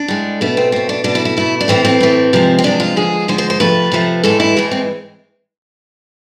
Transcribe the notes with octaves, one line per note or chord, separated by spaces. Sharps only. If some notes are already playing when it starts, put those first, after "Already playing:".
Already playing: D4
A2 G#3
B2 A3 B3
C4
B2 A3 C4
D4
B2 A3 D4
E4
E4
B2 A3 E4
D4
A2 E3 A3 C4
C4
A2 E3 A3
C3 F3 G#3
C4
C3 F3 G#3 D4
F4
D3 F3 G#3 G#4
D3 F3 G#3 C5
C5
C5
C3 F3 A3 B4
C3 F3 A3
A2 E3 G#3 A4
E4
A2 E3 G#3
C4